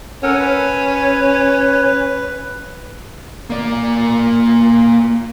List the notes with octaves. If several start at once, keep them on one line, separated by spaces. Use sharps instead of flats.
C#4 A4 A#4 F#5
B4
A#3 D5